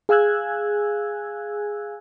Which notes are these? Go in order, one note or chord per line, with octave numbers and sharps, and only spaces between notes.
G#4 F5 G#5 E6 F#6 G#6